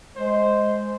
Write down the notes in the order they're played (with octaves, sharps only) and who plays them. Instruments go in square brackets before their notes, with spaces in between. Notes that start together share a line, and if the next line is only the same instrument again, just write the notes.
[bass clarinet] G#3 [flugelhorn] C5